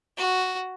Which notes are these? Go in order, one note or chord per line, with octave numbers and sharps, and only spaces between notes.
F#4